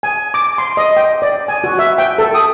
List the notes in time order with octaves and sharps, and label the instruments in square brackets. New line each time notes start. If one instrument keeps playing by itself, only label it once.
[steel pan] G#5
D6
C6
D#5
G5
D5
G#5
F#4
E5
G5
A4
D#6